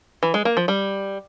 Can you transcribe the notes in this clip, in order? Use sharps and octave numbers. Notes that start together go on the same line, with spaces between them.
E3
G#3
A#3
F3
G3